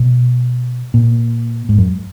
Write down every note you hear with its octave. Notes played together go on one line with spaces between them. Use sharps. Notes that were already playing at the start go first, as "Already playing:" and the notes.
Already playing: B2
A#2
G#2
F#2